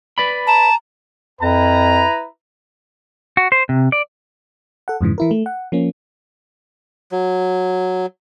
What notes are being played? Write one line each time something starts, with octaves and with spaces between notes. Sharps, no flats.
B4 D5 B5
A5 A#5
F2 E4 B4 A#5
F#4
C5
C3
D5
A4 F#5
F2 G#2 C#3 E3
E3 E4 A#4
A3
F#5
F3 A#3 C#4
F#3